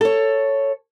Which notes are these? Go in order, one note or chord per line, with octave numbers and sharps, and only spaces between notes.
A4 C#5